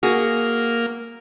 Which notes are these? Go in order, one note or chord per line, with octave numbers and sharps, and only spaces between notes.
A#3 F#4 G#4 F6